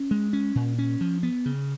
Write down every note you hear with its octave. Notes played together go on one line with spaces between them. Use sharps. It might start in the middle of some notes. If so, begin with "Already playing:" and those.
Already playing: C#4
G#3
C#4
A#2
C#4
F3
B3
C#3